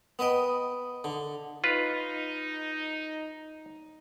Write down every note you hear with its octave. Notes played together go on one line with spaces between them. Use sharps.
B3 B4 D#5 G5
D3
D#4 F4 B4